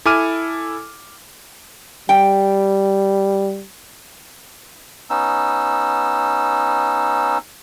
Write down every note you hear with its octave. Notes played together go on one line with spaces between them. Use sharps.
E4 A4 G#5 D6 F6 D#7
G3 G5
B3 C#4 D#4 E6